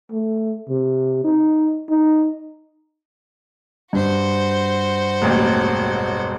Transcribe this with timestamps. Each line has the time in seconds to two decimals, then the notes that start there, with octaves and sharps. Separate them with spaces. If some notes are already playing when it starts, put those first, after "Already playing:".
0.12 A3
0.69 C3
1.24 D#4
1.90 D#4
3.93 G2 F#4 C5
5.22 E1 A1 D#2